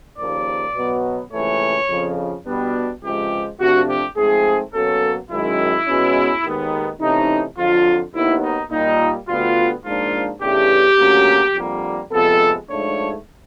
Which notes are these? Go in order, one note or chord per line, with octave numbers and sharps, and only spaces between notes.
D#2 C#3 F3 A#3 D5
B2 F#3 B3
C#2 C3 E3 A3 C#5
F2 C#3 F3
B2 G3 B3 D4
C#2 C3 F3 G#3 G4
C3 F3 A3 D4 F#4
G4
G#2 F3 A3 C4 G#4
B2 F#3 A#3 C#4 A4
F#2 D#3 G#3 E4
B2 G#3 C#4
D#2 D#3 G#3 B3
C3 E3 A3 C#4 D#4
F2 D3 F#3 F4
D#2 D#3 F#3 B3 E4
D#4
A#2 G3 A#3 D#4
D2 D3 G3 B3 F4
G#2 F3 A#3 D4 F4
E2 C#3 E3 A3 D4 G4
D2 C#3 F#3 A#3 C#4
F2 D3 G3 A#3
F2 C3 F3 G#3 B3 A4
G#2 F3 A3 D4 C#5